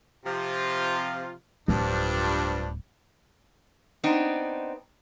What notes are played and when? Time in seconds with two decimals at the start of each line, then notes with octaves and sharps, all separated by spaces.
0.25 C3 F3 F4
1.68 D1 G2 F3 D4
4.04 B3 C4 D4 D#4